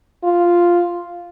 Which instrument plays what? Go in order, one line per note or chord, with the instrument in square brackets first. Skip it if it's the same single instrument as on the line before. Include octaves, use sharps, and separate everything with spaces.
[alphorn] F4